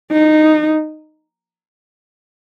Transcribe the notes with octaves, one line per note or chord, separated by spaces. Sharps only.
D#4